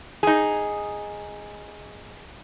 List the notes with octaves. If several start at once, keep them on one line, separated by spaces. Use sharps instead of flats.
D#4 G#4